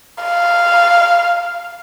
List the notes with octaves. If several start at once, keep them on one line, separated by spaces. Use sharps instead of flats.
F5